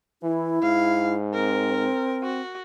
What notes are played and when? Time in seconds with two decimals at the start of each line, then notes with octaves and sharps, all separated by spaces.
0.23 E3 E4
0.63 G#2 F5
1.34 C4 A#4
2.23 F#4